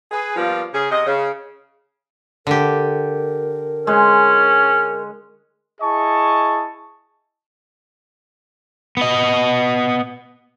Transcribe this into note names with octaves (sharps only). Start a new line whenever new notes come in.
G#4 B4
F3 G3 A#3 B3 F4
C#3 G#4
C3 D#5
C#3
D3 G4 A#4
G#3 C#4
E4 G#4 D#5 A5 C#6
B3 D#5